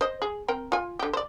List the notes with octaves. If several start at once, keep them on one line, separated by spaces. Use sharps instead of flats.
C5 D#5
G#4
C4 A#4 G5
F4 G#5
D3 G4
C5 D5